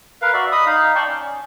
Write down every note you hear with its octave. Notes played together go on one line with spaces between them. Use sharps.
A#4 B4 F5
F#4 D5 E5
D#5 B5 D#6
D#4 F5
D5 G5 A5 C#6
C#4